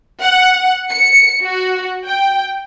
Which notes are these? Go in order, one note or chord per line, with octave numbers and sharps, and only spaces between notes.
F#5
C#7
F#4
G5